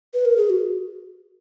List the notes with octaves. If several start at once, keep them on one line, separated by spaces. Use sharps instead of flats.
B4
A#4
G#4
F#4